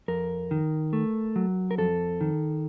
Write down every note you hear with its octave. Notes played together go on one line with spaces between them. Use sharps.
F2 A#4
D#3
A3
F#3
A#4
F2 A4
D#3